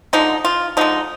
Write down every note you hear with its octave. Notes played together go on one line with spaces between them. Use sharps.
D3 F3 G#3 D#4
F4
D3 F3 G#3 D#4